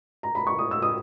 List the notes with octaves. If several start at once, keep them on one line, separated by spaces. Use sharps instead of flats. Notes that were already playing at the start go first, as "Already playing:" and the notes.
A#5
B5
C#6
D#6
E6
D#6